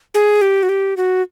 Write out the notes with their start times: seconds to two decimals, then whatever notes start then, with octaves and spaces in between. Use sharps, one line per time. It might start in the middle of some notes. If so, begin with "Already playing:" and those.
0.14 G#4
0.41 G4
0.63 F#4
0.69 G4
0.97 F#4